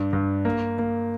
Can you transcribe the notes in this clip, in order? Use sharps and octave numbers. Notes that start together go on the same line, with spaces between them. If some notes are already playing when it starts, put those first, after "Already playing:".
Already playing: G2 D4
G2
A#3
A#3